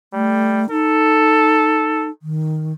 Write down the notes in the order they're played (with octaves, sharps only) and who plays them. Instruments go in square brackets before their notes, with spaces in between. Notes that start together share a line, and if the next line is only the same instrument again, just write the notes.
[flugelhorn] G3 [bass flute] A3
[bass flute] D#4 [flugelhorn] A4
[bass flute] D#3